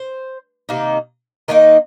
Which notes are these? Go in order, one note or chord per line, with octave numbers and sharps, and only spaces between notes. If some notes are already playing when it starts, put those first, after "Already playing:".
Already playing: C5
C3 D#3 A#3 D#4
D#3 A#3 D#4 A#4 D#5